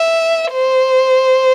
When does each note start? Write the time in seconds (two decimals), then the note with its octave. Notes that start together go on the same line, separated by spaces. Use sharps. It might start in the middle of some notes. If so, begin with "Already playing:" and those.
Already playing: E5
0.53 C5